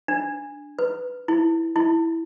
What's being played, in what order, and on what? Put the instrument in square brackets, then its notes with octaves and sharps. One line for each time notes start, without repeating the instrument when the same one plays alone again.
[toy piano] D4
B4
E4
E4